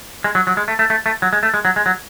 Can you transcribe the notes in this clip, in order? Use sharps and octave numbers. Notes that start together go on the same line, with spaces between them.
G#3
F#3
F#3
G#3
A3
A3
A3
A3
F#3
G#3
A3
G#3
F#3
G#3
F#3